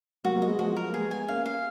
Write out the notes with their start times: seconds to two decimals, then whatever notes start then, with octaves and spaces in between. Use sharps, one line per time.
0.24 F#3 A#3 F#4
0.36 F#3 A#3
0.42 D#5
0.47 G#3 B3
0.59 F3 G#3 F#4
0.76 A#4
0.87 A#3
0.93 G#3 B3 G#4
1.11 G#5
1.28 A#3 C#4 F5
1.46 F5